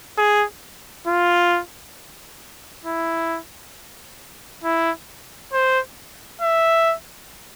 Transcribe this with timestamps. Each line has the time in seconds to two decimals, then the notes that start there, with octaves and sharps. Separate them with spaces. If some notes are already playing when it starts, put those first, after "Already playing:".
0.18 G#4
1.07 F4
2.85 E4
4.64 E4
5.53 C5
6.42 E5